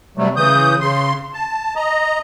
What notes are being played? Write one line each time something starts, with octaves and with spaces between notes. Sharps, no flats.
C3 F#3 G3 A3
C#3 E3 D#6 G6
C#3 C6
A5
D#5 A#5